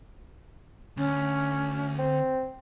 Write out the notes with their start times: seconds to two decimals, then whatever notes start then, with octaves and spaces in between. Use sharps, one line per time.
0.97 D2 C#4
1.99 C4